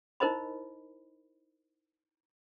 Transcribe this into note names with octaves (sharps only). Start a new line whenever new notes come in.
D#4 E4 A#4 C5 D#5 B5